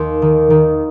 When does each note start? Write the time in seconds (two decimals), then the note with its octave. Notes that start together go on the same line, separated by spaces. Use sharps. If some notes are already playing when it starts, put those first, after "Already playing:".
Already playing: D#2 C6
0.22 D#3
0.50 D#3